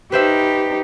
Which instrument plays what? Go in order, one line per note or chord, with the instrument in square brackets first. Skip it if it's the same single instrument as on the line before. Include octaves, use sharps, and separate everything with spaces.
[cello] D#4 G4 [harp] B4 C5 E5